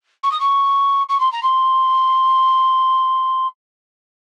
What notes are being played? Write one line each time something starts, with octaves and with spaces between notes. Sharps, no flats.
C#6
D#6
C#6
C#6
C6
A#5
C6